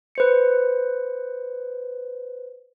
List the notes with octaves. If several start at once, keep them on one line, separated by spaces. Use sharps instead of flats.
B4 C5 C#7